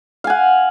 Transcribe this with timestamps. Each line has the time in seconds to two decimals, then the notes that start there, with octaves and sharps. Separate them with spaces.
0.24 F5
0.27 G#5
0.30 F#5